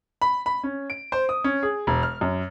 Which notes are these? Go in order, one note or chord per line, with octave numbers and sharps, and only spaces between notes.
B5
B5
C#4
D7
C5
D#6
C#4
G#4
E1
F6
F#2